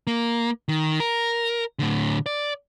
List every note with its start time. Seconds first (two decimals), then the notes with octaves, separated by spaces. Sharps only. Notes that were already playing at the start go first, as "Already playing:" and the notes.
0.07 A#3
0.68 D#3
1.00 A#4
1.79 A2 D3
2.26 D5